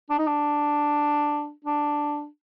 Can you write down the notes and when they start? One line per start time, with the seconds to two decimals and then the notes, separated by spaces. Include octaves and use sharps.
0.10 D4
0.19 D#4
0.27 D4
1.65 D4